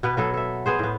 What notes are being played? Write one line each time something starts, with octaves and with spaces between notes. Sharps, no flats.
B2 B3 B4
F#3 B3 A4
A4 E5
B3 G#4 C5
A2 B3